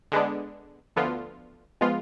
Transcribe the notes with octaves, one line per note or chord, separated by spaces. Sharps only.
D3 G#3 B3 D4
D2 D3 F3 B3 F4
F3 G#3 B3 F4